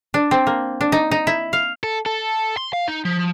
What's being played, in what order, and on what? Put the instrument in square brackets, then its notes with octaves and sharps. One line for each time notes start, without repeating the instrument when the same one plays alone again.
[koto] D4
C4
A#3
D4
D#4
D#4
E4
F5
[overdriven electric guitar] A4
A4
C6
F5
D#4
F3